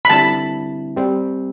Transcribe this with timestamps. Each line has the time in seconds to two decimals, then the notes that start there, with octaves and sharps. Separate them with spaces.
0.05 B5
0.10 D3 G3 C4 E4 A5
0.96 G3 C4 G4